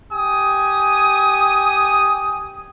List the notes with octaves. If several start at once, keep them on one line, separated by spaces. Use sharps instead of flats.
G4 G#5 D#6